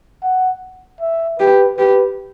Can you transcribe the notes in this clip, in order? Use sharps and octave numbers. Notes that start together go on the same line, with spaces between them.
F#5
E5
G4 B4
G4 B4